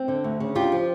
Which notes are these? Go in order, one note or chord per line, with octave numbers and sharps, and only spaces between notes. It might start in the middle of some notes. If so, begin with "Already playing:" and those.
Already playing: C4
D3
D2
C#3
D4 F4 G4
F3